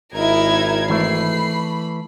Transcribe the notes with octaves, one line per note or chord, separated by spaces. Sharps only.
G#1 D#4 E4 A#4 G#6
E3 A3 B5 C7